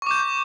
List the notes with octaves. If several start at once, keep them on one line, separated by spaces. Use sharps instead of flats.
C#6 D6 G6